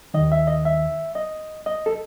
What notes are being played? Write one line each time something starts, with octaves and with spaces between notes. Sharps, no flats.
D#2 D#3 D#5
E5
D#5
E5
D#5
D#5
A4